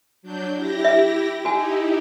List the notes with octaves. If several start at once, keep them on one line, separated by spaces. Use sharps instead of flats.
F#3 D4 G6
E4 G4 A#6
E5
D#4 E4 F#4 G4 G#5